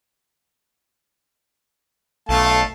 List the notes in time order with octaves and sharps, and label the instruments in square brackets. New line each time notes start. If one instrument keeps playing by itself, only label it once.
[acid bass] B1 [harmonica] A3 F5 A5